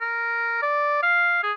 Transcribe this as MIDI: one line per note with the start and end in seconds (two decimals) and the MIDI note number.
0.01 0.59 70
0.62 1.00 74
1.03 1.39 77
1.43 1.52 68